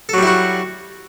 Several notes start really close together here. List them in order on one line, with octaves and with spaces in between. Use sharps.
A4 F#3 G3 E4 F#4